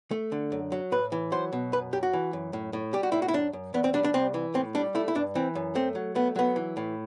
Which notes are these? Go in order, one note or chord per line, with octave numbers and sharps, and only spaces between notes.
A3
D3
F#2
F#3
A2 B4
E3
F#3 C5
B2
F#2 B4
F#2 G4
F#4
E3
F#2
A2
A2
G3 G4
F#4
A2 E4
F#4
E4
F#2 D4
F#2
E2 B3
C4
G3 D4
D4
C2 C4
E3
A2 C4
G3 D4
A3 E4
E4
G2 D4
E3 C4
F#2
A3 C4
F#3
A3 B3
F#3 B3
E3
A2